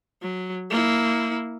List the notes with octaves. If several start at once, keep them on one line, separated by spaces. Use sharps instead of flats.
F#3
A#3 E4